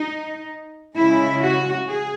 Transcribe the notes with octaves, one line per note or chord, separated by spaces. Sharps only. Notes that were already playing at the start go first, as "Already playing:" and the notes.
Already playing: D#4
C#3 G#3 E4
F#4
G#4